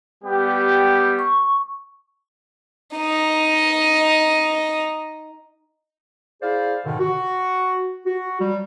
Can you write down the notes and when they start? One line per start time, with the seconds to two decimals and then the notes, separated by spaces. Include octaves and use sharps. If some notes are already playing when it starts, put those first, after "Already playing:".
0.23 G3 B3 G4
1.19 C#6
2.96 D#4 D#5
6.42 E4 G#4 C5 D5 F5
6.85 G#2 B2 D3 D#3
6.99 F#4
8.05 F#4
8.40 F#3 G3